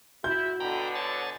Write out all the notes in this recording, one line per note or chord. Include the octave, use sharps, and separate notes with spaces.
E4 F#4 G6
B2 D3 G5 A#5 B5
C#5 G#5 A6